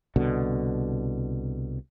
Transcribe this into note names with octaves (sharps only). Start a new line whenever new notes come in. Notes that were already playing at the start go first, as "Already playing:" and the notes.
C2 B2 D3